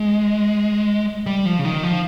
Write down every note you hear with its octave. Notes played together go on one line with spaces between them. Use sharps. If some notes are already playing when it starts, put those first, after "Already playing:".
Already playing: G#3
G3
F3
C#3
D#3
F3